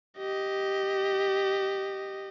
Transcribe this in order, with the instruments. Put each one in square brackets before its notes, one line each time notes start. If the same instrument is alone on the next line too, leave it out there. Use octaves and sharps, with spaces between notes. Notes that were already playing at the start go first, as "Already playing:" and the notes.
[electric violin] G4 D#5